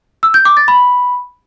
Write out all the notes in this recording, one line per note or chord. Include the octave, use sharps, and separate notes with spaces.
E6
G6
D6
A6
B5